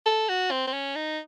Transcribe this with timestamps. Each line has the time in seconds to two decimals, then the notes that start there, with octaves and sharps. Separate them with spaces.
0.06 A4
0.29 F#4
0.51 C4
0.67 C4
0.73 C#4
0.95 D#4